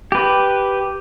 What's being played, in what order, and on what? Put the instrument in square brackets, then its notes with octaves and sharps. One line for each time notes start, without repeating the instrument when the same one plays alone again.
[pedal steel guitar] G4 B4